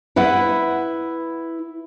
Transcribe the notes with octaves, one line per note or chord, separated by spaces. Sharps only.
E4 B4 E5 F#5